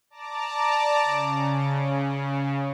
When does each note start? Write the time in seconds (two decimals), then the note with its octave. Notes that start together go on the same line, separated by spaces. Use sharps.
0.10 D5 A5 A#5 D6
1.03 C#3